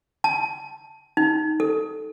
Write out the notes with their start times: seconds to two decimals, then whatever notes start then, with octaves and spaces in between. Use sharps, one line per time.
0.24 A5
1.17 D#4
1.60 A4